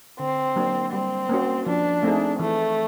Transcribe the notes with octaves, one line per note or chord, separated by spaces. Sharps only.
D3 C4
F#3 A#3 D4
G3 C4
A#3 C#4 F#4
F3 D4
A3 C4 D#4 G#4
E3 A3